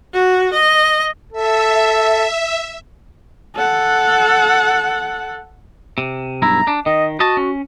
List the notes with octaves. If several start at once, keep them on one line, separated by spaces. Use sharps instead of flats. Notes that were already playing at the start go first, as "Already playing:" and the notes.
F#4
D#5
A4 E5
A4 F#5
C3
B1 G2 E4 A#5
D4
D#3 D#5
F#4 D#5 A5
C#4